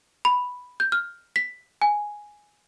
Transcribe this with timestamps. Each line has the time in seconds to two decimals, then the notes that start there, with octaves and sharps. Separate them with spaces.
0.25 B5
0.80 G6
0.92 F6
1.36 B6
1.82 G#5